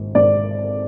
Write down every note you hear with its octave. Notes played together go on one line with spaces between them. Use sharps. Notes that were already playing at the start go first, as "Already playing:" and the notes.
Already playing: G#1
G#1 D5